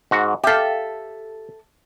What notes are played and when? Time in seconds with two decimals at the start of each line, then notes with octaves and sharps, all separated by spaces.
0.11 G#2 F#4
0.44 G4 A4 E5 F5